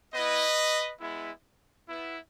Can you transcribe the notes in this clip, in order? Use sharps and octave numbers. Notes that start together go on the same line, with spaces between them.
B3 E4 B4 D#5
G#3 B3 E4
B3 E4